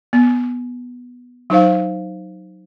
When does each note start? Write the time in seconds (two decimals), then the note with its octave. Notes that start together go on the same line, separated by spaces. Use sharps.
0.13 B3
1.50 F#3 D#4 C5 F5